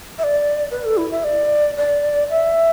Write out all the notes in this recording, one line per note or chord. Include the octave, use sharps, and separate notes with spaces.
E5
D5
B4
A4
E4
E5
D5
D5
E5